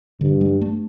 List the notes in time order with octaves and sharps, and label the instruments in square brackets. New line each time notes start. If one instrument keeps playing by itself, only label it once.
[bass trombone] G2 [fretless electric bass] D3
[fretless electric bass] G3
A3